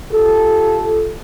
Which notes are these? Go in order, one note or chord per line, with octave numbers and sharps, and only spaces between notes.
F4 G4 A4